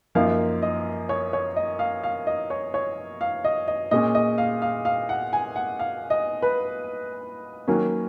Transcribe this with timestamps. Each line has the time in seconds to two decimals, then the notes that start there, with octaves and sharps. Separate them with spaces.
0.15 F#2 F3 A#3 D#4 F5
0.62 D#5
1.09 C#5
1.33 C#5
1.56 D#5
1.79 F5
2.03 F5
2.27 D#5
2.50 C#5
2.74 C#5
3.21 F5
3.44 D#5
3.68 D#5
3.91 A#2 G#3 C#4 D#5
4.15 D#5
4.38 F5
4.62 F5
4.85 F5
5.09 F#5
5.33 G#5
5.56 F#5
5.79 F5
6.10 D#5
6.42 B4
7.67 D#3 F#3 A#3 C#4